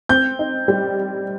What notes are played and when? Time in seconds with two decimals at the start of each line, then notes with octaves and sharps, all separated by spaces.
0.09 C4 G6
0.39 D#4
0.68 G3